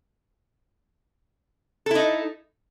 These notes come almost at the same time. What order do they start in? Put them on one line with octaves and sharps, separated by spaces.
A4 E4 D#4